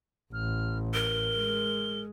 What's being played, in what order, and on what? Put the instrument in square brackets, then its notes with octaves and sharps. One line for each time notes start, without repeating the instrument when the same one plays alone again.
[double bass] A1 [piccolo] F6
[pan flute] A#4 [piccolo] G7
[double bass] G#3